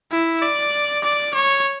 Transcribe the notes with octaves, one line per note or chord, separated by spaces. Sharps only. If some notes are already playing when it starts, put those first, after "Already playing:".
E4
D5
D5
C#5